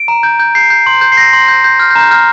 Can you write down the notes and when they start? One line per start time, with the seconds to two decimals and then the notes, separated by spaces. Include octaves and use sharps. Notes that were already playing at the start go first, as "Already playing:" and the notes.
Already playing: D7
0.08 A#5
0.23 G6
0.40 G6
0.55 G6 C7
0.70 G6
0.86 C6
1.01 G6
1.12 C7
1.17 G6 A#6
1.33 C6
1.48 G6
1.64 G6
1.80 F6 G6
1.90 G6
1.95 A#5
2.01 G6
2.11 F6 G6